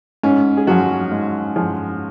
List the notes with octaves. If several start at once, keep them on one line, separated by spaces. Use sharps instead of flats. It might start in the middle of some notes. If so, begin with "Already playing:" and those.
G#2 C#4
G#4
F3 F#3 G#3 F#4
G#2
F3 G#3